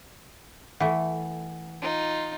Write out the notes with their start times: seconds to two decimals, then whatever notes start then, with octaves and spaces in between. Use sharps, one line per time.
0.80 E3 A3 F#5
1.82 D#4 F4